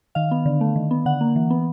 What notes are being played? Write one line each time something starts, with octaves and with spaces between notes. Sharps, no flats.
D#3 F5
B3
D3
A3
D#3
B3
D3 F#5
A#3
E3
B3